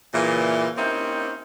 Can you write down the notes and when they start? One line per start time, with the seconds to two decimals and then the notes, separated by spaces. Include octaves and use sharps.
0.14 A#2 C#3 E3
0.78 A#3 C4 C#4 D#4 E4 G4